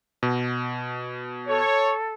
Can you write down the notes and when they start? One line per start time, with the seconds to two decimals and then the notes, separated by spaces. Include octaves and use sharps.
0.23 B2
1.48 A4 C#5